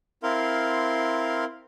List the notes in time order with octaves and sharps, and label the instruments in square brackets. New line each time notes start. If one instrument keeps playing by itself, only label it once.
[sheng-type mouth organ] C4 E4 A#4 F5 C6